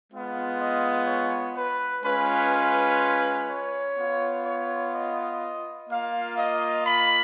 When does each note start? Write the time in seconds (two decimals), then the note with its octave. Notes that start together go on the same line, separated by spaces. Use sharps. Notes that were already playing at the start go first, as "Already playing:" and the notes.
0.11 G#3 B3 F4
0.59 D#5
1.07 C#5
1.56 B4
2.04 G#3 C#4 F4 B4
2.52 B4
3.48 C#5
3.97 B3 F4
4.45 C#5
4.93 D#5
5.89 A#3 F4 F5
6.37 D#5
6.85 B5